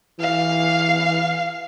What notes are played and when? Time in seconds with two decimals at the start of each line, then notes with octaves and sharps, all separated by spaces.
0.20 E3 F5